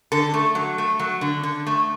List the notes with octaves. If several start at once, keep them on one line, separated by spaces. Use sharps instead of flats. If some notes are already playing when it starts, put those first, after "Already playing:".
D3 A4
A3
F#3
A3
F#3
D3
D3
A3